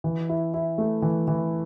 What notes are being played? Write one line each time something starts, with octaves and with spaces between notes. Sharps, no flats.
E3
E4
E4
A3
E3
E3